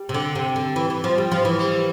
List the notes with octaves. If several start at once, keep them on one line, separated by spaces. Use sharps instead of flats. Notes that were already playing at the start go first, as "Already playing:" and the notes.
Already playing: G3
C3
D3
C3
D3
E3
E3
F3
G3
F3
E3
G3